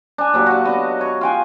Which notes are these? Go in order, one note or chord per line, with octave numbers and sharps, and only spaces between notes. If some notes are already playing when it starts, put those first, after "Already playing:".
D4 G#5
A#2 F#3 G4
F#4 A5
B3 D4 D#5
C#5
F4 G5 G#5